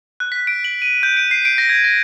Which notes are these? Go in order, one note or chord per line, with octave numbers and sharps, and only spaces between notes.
F#6
B6
D7
F#7
D#7
G6
D7
C7
D7
A#6
G#6
A#6